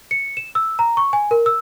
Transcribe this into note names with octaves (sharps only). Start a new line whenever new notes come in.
C#7
E7
E6
A#5
C#6
G#5
A#4
E6